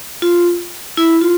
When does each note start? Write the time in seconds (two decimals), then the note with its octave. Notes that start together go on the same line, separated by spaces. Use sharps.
0.22 F4
0.97 E4
1.22 F4